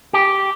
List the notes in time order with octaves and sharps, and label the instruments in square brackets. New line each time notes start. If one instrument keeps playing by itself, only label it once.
[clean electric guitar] G4